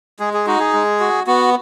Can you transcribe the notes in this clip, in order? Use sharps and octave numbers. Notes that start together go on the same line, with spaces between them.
G#3 G#4
G#4
D#4 F#4
G#4
G#3
F#4
B3 F#4